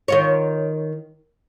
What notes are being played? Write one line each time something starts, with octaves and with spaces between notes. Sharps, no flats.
D#3 F4 C#5